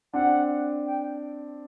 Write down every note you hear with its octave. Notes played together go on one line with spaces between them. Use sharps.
C4 D4 F#5
G5